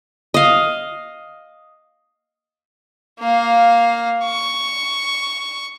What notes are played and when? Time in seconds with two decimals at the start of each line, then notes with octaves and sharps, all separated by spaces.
0.34 D#5 F5
3.20 A#3 F5
4.25 C#6